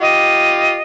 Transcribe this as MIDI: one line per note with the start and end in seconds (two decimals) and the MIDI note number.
0.01 0.81 65
0.01 0.81 67
0.01 0.82 75